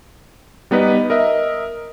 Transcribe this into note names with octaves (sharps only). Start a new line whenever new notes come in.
G3 B3 D#4 B4 D#5
A#4 D#5 E5